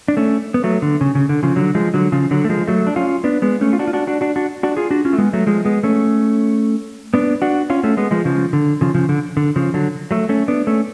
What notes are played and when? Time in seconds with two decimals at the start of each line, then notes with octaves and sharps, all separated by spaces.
0.08 D4
0.17 A3 C#4
0.54 B3
0.64 F#3 A3
0.82 D3
1.01 C#3
1.15 C#3
1.29 D3
1.43 C#3 F3
1.56 D3 F#3
1.75 F3 G#3
1.94 D3 F#3
2.12 C#3 F3
2.31 D3 F#3
2.45 A3
2.49 F3 G#3
2.68 F#3 A3
2.87 D4
2.96 C#4 F4
3.24 B3 D4
3.42 G#3 B3
3.61 A3 C#4
3.73 F4
3.79 D4 F#4
3.88 F4
3.93 D4 F#4
4.07 D4 F#4
4.21 D4 F#4
4.36 D4 F#4
4.63 D4 F#4
4.77 F4 G#4
4.91 D4 F#4
5.05 C#4 F4
5.13 A3
5.18 G#3 B3
5.33 F#3 A3
5.47 F3 G#3
5.65 G#3 B3
5.83 A3 C#4
7.14 B3 D4
7.42 D4 F#4
7.70 C#4 F4
7.83 A3 C#4
7.97 G#3 B3
8.11 F3 G#3
8.25 C#3 F3
8.53 D3
8.81 C#3 F3
8.95 C#3 F3
9.09 D3
9.37 D3
9.56 C#3 F3
9.74 D3 F#3
10.11 F#3 A3
10.29 A3 C#4
10.48 B3 D4
10.67 A3 C#4